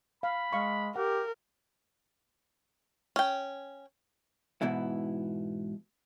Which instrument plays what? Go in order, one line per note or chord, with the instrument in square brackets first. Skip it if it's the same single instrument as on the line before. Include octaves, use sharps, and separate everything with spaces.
[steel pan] F5 [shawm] B5
[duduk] G#3 [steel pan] F5 C#6
[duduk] G4 [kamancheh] A#4 [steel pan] F#5
[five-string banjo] C#4 G5
[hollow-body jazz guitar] G#2 B2 E3 E4